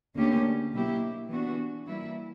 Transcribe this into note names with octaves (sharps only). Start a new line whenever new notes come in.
D2 D3 A#3 C#4 G4
B2 F#3 A#3 E4 G4
E3 B3 D4 F#4
E3 G3 A#3 E4